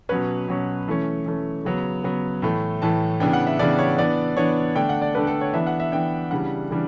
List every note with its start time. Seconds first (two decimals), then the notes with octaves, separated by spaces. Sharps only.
0.09 B2 F#3 C#4 B4
0.48 B2 F#3 C#4
0.88 E3 A3 C#4
1.26 E3 A3 C#4
1.65 C#3 F#3 B3
2.03 C#3 F#3 B3
2.42 A2 E3 A3
2.82 A2 E3 A3 A5
3.20 C#3 E3 B3 D4 G5
3.33 F#5
3.47 E5
3.59 C#3 E3 B3 D4 D5
3.79 C#5
3.98 E3 B3 D4 D5
4.37 E3 B3 D4 C#5
4.76 D3 A3 D4 G5
4.89 F#5
5.02 D5
5.15 D3 A3 D4 B4
5.27 A4
5.41 C#5
5.53 E3 B3 D4 E5
5.67 F#5
5.80 E5
5.92 E3 B3 D4 G5
6.31 C#3 E3 G3 D4 F#5
6.70 C#3 E3 G3 D4